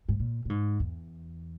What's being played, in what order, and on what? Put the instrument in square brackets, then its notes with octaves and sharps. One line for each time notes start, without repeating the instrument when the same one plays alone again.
[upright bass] G#2
A#2
A#2
G#2
E2